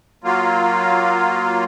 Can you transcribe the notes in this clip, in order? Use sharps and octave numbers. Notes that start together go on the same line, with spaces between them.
F#3 A#3 F4